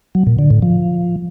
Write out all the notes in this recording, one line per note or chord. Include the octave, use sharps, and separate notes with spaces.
F#3
A#2
D3
A2
F3